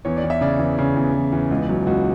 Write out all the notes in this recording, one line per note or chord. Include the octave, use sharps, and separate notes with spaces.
E2 C#5
D5
E2
E5
C#3 D5
E2
C#3
E2
E2
E2
C#2
F#3
C#2 F#4